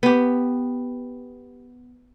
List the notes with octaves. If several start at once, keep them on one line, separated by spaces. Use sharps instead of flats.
B3 G4